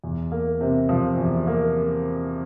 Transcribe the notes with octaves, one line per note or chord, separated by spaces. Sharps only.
E2
A#3
C3
F3
E2
A#3